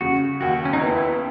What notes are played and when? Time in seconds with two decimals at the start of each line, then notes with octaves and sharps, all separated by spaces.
0.01 C#3 F#4
0.41 D#2 F#4
0.65 C#4
0.73 D#4
0.81 B3 E4